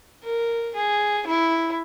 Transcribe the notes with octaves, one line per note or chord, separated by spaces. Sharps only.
A#4
G#4
E4